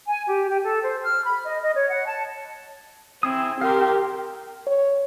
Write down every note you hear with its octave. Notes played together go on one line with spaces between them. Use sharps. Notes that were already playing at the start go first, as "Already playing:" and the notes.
G#5
G4
G4
A4
C5
F6
B5
D#5
D#5
C#5
F#5
A5
C4 E4 G#4 D#6
G4 A#4 F5 C6
C#5